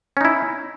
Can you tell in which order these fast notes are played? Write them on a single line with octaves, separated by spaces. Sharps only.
C#4 D#4 E4